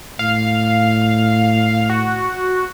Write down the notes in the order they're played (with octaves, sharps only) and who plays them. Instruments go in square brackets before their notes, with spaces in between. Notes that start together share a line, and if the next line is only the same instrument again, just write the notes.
[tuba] A2 [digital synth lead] F5
[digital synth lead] F#4